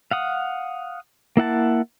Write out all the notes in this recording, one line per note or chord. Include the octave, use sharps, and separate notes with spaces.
F5 F#5 D#6
A#3 E4 F#5 A5